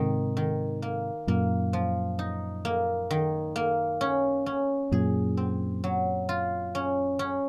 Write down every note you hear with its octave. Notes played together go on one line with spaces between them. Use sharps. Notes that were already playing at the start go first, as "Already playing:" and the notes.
Already playing: G#2 C3 D#3
D#3
A#3
F#2 A#2 A#3
F3
D#4
A#3
D#3
A#3
C#4
C#4
F#2 A#2 G#4
C4
F#3
F4
C#4
C#4